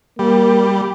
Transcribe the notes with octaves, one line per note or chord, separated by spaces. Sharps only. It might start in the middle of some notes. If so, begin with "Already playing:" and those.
G3 A#3